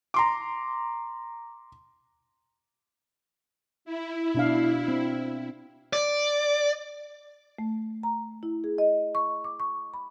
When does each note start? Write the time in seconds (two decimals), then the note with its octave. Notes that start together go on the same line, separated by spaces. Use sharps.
0.14 A#5 C6 D6
3.85 E4
4.35 B2 D4 F5
4.88 C4
5.93 D5
7.58 A3
8.03 A#5
8.43 E4
8.64 G#4
8.78 D#5
9.15 C#6
9.44 D6
9.60 C#6
9.94 B5